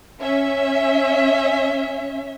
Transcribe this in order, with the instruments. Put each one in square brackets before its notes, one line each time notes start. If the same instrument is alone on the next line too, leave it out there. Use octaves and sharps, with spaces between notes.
[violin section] C#4 E5